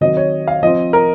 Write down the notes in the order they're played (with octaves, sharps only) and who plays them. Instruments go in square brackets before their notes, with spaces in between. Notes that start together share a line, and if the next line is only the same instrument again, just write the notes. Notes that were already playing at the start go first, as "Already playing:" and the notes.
[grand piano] D#3 F#3 C4 D#5
C#5
F5
F3 C4 D#5
A#4